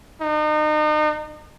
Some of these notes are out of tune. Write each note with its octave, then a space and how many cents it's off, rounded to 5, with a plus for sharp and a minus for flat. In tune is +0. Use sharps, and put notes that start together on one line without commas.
D#4 -35